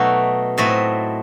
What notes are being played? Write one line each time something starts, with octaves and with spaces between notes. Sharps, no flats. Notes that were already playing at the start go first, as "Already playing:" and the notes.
Already playing: B2 F#3 A3 D#4 E5
A2 F#3 A3 C4 D#5